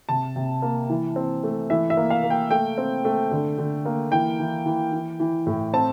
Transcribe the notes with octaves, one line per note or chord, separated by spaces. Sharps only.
C3 A5
C3
A#3
E3
C4
A3
E3 E5
E5
A#3
F5
A#3
G5
A3 G5
C4
A3
D3
D3
A#3
E3 G5
E3
E3
E3
E3
A2
C4 A5